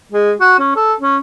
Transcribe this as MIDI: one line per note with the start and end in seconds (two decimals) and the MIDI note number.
0.12 0.33 56
0.40 0.59 66
0.59 0.73 61
0.76 0.93 69
1.00 1.18 61